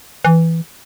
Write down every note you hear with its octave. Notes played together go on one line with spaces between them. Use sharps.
E3